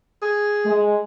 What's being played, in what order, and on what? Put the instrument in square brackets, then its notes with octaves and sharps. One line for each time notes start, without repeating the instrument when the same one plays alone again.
[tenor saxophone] G#4
[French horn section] G#3